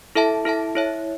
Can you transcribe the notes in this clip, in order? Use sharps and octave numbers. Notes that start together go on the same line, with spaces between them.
E4 A4 E5 A5
E4 A4 E5 A5
E4 C#5 E5